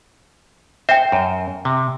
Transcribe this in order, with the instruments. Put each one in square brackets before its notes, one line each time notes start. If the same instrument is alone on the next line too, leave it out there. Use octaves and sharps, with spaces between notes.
[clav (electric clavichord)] C5 [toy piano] E5 G5
[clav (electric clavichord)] F#2
C3